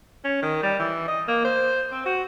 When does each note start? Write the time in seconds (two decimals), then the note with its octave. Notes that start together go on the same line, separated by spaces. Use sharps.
0.24 C#4
0.43 D#3
0.63 G3
0.80 E3
1.08 D#5
1.28 A#3
1.45 C5
1.92 C4
2.06 F#4